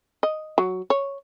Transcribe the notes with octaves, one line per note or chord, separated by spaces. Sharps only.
D#5
F#3
C#5